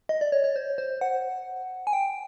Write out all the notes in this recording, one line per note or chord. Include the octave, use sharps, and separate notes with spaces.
D#5
D5
C#5
C#5
C5
C5
F#5
G#5
G5